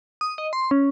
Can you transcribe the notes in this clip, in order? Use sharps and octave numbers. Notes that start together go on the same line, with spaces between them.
D#6
D#5
C6
C#4